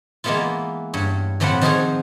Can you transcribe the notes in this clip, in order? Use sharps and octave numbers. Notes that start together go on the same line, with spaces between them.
E3 G#3 A#3 B3 E4 F4
G2 C#5
A2 E3 F3 C4 F#5 B5
D#3 F3 F4 F#4 G#4 C5